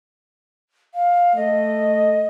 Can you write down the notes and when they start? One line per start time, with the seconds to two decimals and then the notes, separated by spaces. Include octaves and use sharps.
0.94 F5
1.36 A3 D#5